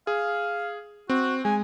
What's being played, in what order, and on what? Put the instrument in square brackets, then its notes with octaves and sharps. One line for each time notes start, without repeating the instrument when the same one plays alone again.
[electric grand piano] G#4 [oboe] F5
[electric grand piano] C4 [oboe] F#4
[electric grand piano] G#3 [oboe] G#5